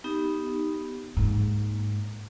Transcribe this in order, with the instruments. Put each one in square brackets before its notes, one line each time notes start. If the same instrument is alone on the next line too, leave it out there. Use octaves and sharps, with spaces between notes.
[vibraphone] B3 D#4 G4
[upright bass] G#2 [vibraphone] A#3